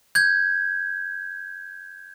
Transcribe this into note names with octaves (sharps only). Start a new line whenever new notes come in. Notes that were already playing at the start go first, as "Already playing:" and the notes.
G6 G#6